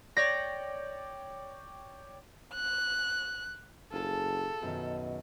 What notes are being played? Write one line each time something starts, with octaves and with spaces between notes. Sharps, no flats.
C#5 D5 G5 A#6
F#6
F#1 F4 G#4 A4 A5
F#2 B2 D#3